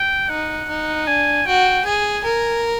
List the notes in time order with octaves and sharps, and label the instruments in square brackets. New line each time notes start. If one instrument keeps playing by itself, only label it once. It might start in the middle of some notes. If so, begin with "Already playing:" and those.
Already playing: [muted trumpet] G5
[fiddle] D#4 [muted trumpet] F#5
[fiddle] D#4
[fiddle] D4 [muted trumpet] G#5
[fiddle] F#4 [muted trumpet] G5
[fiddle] G#4 [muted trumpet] G#5
[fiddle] A#4